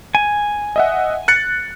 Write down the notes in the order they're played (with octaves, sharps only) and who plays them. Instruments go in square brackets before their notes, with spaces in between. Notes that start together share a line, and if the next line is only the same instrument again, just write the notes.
[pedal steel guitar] G#5
[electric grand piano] D#5 E5 F#5
F#6 A6 C#7